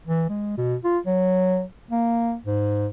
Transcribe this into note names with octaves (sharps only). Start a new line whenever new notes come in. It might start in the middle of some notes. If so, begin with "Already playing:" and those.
E3
G#3
B2
F4
F#3
A#3
G#2